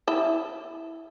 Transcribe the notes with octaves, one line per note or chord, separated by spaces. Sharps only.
E4 E5